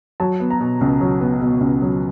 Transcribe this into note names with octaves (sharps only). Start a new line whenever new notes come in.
F#3 A5
B3
A#5
B2
C#2
F#3
B3
B2
C#2
F#3